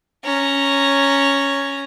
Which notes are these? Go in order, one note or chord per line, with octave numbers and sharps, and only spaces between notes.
C#4 A#5